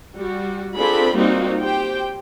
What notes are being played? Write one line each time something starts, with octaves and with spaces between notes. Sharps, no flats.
G3 F#4
C4 D4 F4 G#4 A4 B5
G3 A#3 C4 D#4 F4 F#4
G4 C5 G5